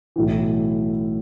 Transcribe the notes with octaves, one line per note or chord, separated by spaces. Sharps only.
B1 A2 E3